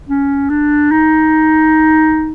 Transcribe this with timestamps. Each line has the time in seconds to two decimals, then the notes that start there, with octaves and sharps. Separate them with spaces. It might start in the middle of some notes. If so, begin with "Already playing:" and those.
0.09 C#4
0.50 D4
0.91 D#4